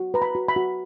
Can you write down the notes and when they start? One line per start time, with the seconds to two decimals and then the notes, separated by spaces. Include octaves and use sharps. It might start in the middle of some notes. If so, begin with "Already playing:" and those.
Already playing: F#4
0.14 B4 A#5
0.22 B5
0.35 F#4
0.49 B5
0.56 F#4